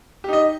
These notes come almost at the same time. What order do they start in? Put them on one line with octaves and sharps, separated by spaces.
G4 D#4 D#5